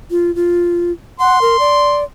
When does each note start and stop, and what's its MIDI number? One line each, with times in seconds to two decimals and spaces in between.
0.11 0.34 65
0.35 0.92 65
1.20 1.39 78
1.20 2.02 84
1.42 1.57 70
1.59 2.04 74